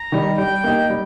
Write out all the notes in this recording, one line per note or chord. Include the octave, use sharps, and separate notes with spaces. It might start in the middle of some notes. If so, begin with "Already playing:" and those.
Already playing: A#5
D#3 G3 D#4
G3 G5
A#3 D#4 G4
G3